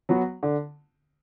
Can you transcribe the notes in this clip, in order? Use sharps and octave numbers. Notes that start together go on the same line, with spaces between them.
F#3 B3 F#4
D3